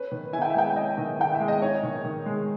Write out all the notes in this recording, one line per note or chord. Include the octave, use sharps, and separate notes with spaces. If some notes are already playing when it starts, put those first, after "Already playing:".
Already playing: C#4 B4
D#3
E4 G#5
G5
E5
G#3 G5
C#4 D#5
D#3
E4 G5
E5
G#3
D#5
D#4 C#5
D#3
D#3
G#3